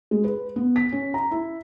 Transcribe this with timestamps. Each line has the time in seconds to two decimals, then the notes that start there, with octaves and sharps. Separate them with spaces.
0.11 G#3
0.24 B4
0.56 B3
0.76 B6
0.92 C#4
1.14 A#5
1.31 E4